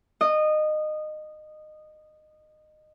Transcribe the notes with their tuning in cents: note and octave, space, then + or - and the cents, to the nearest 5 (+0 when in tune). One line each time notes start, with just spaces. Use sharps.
D#5 -20